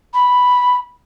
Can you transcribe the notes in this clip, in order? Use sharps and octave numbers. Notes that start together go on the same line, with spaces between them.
B5